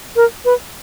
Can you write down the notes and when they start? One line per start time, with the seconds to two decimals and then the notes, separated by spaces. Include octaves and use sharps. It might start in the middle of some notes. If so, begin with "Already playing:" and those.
0.16 A#4
0.45 B4